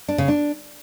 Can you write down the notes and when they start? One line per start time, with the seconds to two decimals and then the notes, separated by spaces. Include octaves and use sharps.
0.08 D4
0.18 C#3
0.28 D4